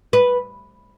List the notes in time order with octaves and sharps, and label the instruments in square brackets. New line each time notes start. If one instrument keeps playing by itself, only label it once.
[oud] B4